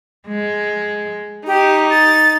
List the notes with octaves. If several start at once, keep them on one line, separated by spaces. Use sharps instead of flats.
G#3
D#4 G4
A6